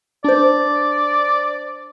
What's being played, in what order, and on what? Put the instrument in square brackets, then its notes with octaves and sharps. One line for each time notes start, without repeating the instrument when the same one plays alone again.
[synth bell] D4 C5 [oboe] D5